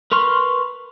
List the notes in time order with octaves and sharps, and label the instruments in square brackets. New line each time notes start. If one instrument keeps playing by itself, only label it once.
[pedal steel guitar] A#4 B4 C6 C#6 F6